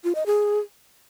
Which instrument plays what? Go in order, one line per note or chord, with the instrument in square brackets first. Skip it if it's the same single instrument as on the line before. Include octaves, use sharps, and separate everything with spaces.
[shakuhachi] F4
D#5
G#4